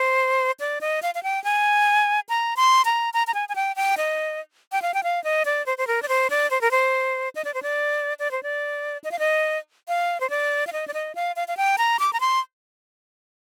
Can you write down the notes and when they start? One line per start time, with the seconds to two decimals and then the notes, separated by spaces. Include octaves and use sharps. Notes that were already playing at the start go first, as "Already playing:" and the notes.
Already playing: C5
0.60 D5
0.81 D#5
1.02 F5
1.15 F5
1.23 G5
1.44 G#5
2.29 A#5
2.57 C6
2.85 A#5
3.14 A#5
3.27 A#5
3.34 G#5
3.49 G#5
3.55 G5
3.76 G5
3.97 D#5
4.72 G5
4.82 F5
4.94 G5
5.03 F5
5.24 D#5
5.45 D5
5.66 C5
5.78 C5
5.87 A#4
6.02 D5
6.09 C5
6.30 D5
6.51 C5
6.61 A#4
6.71 C5
7.35 D#5
7.45 D5
7.54 C5
7.63 D5
8.19 D5
8.31 C5
8.43 D5
9.04 D#5
9.11 F5
9.19 D#5
9.88 F5
10.20 C5
10.30 D5
10.67 F5
10.73 D#5
10.88 D5
10.94 D#5
11.15 F5
11.36 F5
11.48 F5
11.57 G5
11.78 A#5
11.99 D6
12.13 A#5
12.20 C6